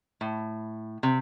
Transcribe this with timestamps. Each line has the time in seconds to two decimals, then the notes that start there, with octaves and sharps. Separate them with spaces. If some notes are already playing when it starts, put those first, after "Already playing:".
0.21 A2
1.03 C3